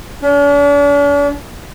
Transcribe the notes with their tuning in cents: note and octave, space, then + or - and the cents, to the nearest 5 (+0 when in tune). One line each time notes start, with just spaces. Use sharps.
D4 -45